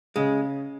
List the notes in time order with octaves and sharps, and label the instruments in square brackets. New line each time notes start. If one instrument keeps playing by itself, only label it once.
[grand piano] C#3 [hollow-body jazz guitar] G#3